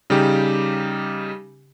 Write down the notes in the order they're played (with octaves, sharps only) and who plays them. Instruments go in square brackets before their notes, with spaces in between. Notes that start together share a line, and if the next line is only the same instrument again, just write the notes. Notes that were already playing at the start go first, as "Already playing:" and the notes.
[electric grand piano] C#3 G3 D#4 G4